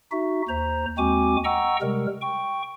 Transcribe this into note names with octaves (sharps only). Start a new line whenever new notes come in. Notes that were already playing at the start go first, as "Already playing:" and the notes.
D#4 F#4 E5
D#2 C5 A#5
D#2 G#3 C4 F#4 G#5 D6
D#5 F#5 G5 A#5 C#6 E6
C3 G3 G#3 A#4
G5 C#6